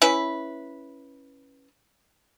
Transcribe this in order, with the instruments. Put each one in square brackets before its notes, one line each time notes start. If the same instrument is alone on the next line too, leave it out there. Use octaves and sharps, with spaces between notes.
[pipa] C#4 E4 B4